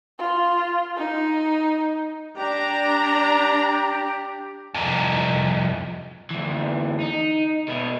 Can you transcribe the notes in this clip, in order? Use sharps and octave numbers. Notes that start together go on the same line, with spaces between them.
F4
D#4
D4 G4 A#5
C2 F2
D2 E3
D#4
B2 E4